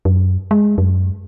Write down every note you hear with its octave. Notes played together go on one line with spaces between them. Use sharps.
F#2
G#3
F#2